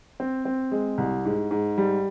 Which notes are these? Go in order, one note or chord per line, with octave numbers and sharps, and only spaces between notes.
C4
C4
G#3
C2
G#2
G#2
G3